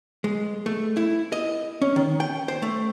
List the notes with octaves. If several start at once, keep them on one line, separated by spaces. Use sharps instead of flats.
G#3
A3
E4
D#5
C#4
D#3
G5
C5
A3